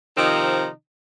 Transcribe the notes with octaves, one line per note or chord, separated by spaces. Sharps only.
C3 D#3 F3 C4 D#4